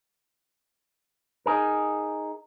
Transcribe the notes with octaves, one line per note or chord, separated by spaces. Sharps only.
D#4 G#4 A#4